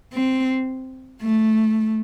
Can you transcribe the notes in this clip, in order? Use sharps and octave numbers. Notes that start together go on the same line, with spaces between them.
C4
A3